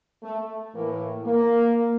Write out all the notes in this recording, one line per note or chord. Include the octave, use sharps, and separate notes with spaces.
A3
A2 E3 A#3
A#3